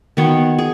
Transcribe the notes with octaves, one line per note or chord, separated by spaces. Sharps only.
D#3 B3 F#4 C#5
G#4